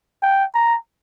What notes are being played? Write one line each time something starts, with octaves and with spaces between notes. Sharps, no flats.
G5
A#5